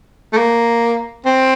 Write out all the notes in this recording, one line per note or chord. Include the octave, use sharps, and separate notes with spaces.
A3
A#3
C4